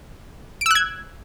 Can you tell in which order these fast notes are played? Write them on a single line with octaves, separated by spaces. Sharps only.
D7 E6 F#6 G#6